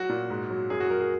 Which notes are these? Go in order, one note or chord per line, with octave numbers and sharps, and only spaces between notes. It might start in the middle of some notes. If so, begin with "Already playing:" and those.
Already playing: F#3 F#4
A#2
G#2
F#3
F#2 G#4
F#4
F#3 A#4
G#4